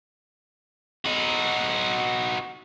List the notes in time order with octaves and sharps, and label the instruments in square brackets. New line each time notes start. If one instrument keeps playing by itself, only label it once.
[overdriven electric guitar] D#4 F#4